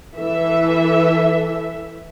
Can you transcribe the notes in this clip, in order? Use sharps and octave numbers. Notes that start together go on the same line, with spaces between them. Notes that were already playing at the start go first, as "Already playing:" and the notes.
E3 A4 E5